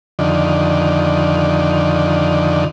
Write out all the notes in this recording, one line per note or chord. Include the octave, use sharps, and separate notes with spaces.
F2 D3 D#3